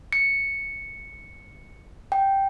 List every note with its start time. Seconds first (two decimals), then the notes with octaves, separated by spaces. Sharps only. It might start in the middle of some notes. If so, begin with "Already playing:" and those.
0.13 C#7
2.12 G5